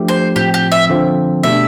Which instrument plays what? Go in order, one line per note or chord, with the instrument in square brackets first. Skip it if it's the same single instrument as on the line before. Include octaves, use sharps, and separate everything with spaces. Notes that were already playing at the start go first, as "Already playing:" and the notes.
Already playing: [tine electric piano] F3 A3 D4 G4
[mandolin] C5
[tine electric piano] A2 F3 C4 [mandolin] G4
[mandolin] G4
E5
[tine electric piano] D3 F3 C4 F4
[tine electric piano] B2 A3 D4 G4 [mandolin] E5